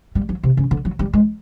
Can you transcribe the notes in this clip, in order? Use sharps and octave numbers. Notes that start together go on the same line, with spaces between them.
G3
F#3
C3
C#3
D3
F#3
G3
G#3